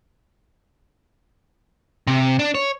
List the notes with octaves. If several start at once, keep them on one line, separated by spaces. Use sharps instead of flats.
C3
D4
C#5